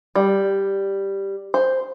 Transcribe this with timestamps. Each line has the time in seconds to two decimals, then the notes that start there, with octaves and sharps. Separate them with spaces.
0.15 G3
1.54 C5